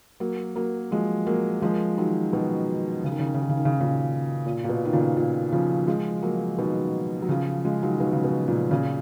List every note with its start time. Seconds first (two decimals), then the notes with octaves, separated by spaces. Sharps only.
0.20 F#3 A#3
0.56 F#3 A#3
0.91 F3 G#3
1.27 F#3 A#3
1.62 F3 G#3
1.97 D#3 F#3
2.33 B2 D#3
3.04 C#3
3.12 D#3
3.19 C#3
3.27 D#3
3.34 C#3
3.42 D#3
3.49 C#3
3.57 D#3
3.65 C#3
3.73 D#3
3.80 A#2 C#3
4.46 A#2
4.64 A#2
4.69 B2
4.85 D#3
4.93 A#2 C#3
5.17 A#2
5.52 C#3 F3
5.87 F3 G#3
6.23 F#3 A#3
6.58 B2 D#3
7.22 F#3
7.29 C#3 F3
7.65 F3 G#3
7.83 D#3 F#3
8.00 B2 D#3
8.13 C#3
8.24 B2
8.48 A#2
8.71 A#2 C#3